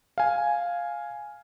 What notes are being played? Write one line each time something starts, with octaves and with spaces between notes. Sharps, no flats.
F5 G#5